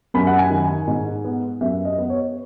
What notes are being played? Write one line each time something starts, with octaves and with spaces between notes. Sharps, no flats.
F#2 B5
F#5
G#5
D#3
G#5
G#2
B3
F#2 E5
D#5
B3
C#5